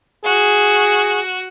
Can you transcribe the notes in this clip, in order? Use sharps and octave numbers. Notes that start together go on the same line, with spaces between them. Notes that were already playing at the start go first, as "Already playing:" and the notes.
F#4 G#4